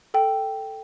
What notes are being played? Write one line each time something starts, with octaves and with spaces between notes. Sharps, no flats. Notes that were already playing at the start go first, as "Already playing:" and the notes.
A4 G5